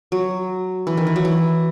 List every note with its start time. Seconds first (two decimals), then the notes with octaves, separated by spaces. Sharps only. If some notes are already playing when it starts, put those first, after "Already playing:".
0.12 F#3
0.87 E3
0.97 D#3
1.07 E3
1.16 F#3
1.25 E3